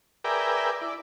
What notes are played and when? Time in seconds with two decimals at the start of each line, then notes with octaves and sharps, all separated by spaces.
0.24 G#4 A#4 B4 D5 E5 G5
0.81 E4 D5